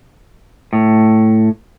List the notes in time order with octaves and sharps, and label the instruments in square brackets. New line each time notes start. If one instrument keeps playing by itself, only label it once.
[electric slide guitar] A2